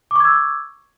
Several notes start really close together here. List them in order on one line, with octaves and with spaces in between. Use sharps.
D6 C#6 G#6 E6